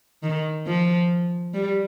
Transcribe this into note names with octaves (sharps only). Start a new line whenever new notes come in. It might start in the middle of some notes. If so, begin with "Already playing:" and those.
D#3
F3
G3